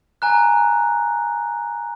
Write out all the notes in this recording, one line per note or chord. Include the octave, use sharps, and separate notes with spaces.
G#5 A#5 F#6